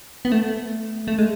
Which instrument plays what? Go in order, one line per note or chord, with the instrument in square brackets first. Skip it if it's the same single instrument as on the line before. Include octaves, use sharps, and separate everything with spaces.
[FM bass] B3
A3
A3
G#3